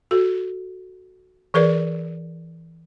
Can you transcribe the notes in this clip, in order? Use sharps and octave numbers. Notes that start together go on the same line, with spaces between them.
F#4 A4
E3 G#4 A#4 B4 D5